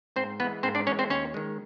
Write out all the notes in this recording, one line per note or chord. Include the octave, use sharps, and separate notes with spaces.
G#2 C4 C5
E3 G#3 B3 B4
G#2 C4 C5
D4 D5
E3 G#3 C#4 C#5
C4 C5
D#2 C#4 C#5
D#3 G#3